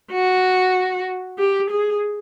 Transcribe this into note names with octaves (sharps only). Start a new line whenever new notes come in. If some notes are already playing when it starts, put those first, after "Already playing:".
F#4
G4
G#4